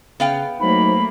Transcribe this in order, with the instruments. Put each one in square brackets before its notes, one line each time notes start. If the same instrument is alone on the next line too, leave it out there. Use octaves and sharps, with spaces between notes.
[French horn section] C#3 [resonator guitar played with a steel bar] B3 F5 G5
[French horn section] F#3 D#4 C5 [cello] A3 A#3 [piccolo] B5